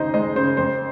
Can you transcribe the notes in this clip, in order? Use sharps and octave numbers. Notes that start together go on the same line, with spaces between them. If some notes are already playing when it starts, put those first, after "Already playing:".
Already playing: D#2 C#3 D#4 C5 D#5
G#3 C5 D#5
C#3 C5
F2 C5